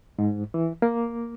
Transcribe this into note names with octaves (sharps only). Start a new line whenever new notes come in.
G#2
E3
A#3